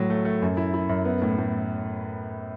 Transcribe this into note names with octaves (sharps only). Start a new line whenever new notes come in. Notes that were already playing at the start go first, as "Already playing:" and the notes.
Already playing: A2 F#3
A3
A3
F#2
E4
E4
F#2
B3
A2
A2